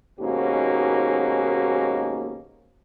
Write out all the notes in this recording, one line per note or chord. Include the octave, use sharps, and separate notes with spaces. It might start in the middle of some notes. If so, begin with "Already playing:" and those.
D#2 G#2 B2 A#3 C#4 F#4